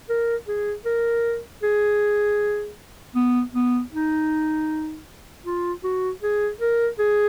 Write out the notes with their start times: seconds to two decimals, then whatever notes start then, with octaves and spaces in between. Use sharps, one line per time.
0.09 A#4
0.47 G#4
0.85 A#4
1.63 G#4
3.15 B3
3.54 B3
3.92 D#4
5.46 F4
5.84 F#4
6.22 G#4
6.61 A#4
6.99 G#4